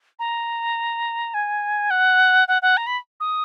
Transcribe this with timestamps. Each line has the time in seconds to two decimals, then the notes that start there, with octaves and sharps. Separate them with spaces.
0.19 A#5
1.34 G#5
1.90 F#5
2.48 F#5
2.62 F#5
2.77 A#5
2.87 B5
3.20 D#6